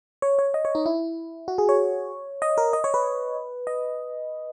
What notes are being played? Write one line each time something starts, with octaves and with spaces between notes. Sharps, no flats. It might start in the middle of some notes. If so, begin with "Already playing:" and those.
C#5
C#5
D#5
C#5
D#4
E4
F#4
G#4
C#5
D#5
A#4
D#5
C#5
B4
D#5